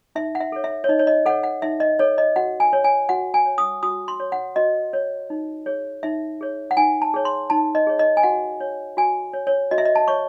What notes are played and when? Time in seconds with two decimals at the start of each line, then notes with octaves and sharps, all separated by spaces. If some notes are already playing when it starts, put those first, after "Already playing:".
0.15 D#4 E5
0.35 F#5
0.40 E5
0.52 A4 C#5
0.64 E5
0.84 C#5
0.89 D#4 D#5
0.99 C#5
1.07 D#5
1.26 A4 C#5 F#5
1.44 F#5
1.62 D#4 E5
1.80 D#5
1.99 A4 C#5
2.18 D#5
2.36 F#4 F#5
2.60 G#5
2.73 C#5
2.84 G#5
3.09 F#4 F#5
3.34 G#5
3.46 C#5
3.58 D#6
3.83 F#4 D#6
4.08 C6
4.20 C#5
4.32 F#5
4.56 F#4 D#5
4.93 C#5
5.30 D#4
5.66 G#4 C#5
6.03 D#4 E5
6.41 G#4 C#5
6.71 F#5
6.77 D#4 G#5
7.02 A5
7.14 G#4 C#5
7.25 C6
7.50 D#4 A5
7.75 D#5
7.87 G#4 C#5
7.99 D#5
8.17 G#5
8.23 F#4 F#5
8.60 C#5
8.97 F#4 G#5
9.33 C#5
9.47 C#5
9.71 F#4 D#5
9.78 E5
9.85 D#5
9.96 A5
10.08 C#5 C#6